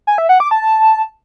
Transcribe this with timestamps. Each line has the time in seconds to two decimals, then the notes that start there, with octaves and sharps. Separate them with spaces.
0.07 G#5
0.18 E5
0.29 F#5
0.40 D6
0.51 A5